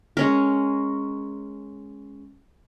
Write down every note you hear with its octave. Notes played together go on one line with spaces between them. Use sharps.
G#3 C#4 A#4